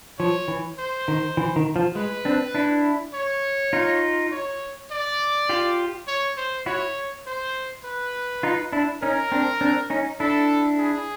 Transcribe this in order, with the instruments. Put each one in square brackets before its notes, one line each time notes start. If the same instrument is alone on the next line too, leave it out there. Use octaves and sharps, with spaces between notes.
[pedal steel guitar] F3 [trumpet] C#5
[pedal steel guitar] E3
[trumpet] C5
[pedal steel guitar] D#3
E3
D#3
F3
[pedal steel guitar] G#3 [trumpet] B4
[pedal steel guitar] C4 D4
D4 E4
[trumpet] C#5
[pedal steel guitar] D#4 F4
[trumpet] C#5
D5
[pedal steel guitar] F4 G4
[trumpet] C#5
C5
[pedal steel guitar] E4 F#4 [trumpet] C#5
[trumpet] C5
B4
[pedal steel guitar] D#4 F4
D4 E4
[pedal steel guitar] C#4 D#4 [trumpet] A#4
[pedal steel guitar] C4 D4
C4 D4
C#4 D#4
[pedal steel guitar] D4 E4 [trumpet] A4
[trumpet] G#4